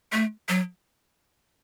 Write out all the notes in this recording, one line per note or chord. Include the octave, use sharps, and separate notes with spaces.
A3
F#3